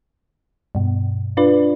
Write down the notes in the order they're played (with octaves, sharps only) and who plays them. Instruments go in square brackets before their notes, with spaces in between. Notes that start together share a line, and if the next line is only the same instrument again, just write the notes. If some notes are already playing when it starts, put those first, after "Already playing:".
[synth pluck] G2 B2
D4 F4 B4 D5